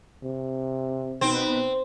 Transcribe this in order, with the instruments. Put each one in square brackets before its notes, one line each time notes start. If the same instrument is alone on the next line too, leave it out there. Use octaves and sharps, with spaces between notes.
[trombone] C3
[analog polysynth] B2 D#4 B4 [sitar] C4